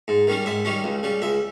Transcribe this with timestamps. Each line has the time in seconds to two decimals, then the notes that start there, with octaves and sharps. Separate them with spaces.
0.08 G#2
0.27 D#3 G3 C#4
0.46 G#2 E5
0.65 D#3 G3 C#4
0.84 C#2
1.03 C#3 G3
1.22 C#2 E5